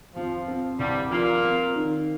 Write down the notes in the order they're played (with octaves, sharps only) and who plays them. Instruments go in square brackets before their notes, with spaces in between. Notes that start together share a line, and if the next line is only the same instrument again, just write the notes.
[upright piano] F2 [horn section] F3
[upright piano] C4
[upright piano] C2 [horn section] G2 G3
[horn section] A#2 A#3 [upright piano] F3
[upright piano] C4
D#3